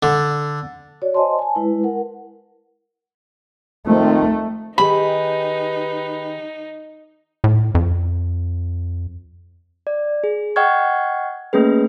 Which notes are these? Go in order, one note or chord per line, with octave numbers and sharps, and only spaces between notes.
D3
F#4 C#5 D5
C5 D#5 G#5 A5 C6
G#5 A5
G#3 E4 B4
A#4 F#5
D#3 F3 A3 C4
D#3 D#4 G4 G#4 B4 B5
A2
F2
D5
G#4
D#5 F#5 G5 C#6 F6 G#6
A3 A#3 C#4 G#4 B4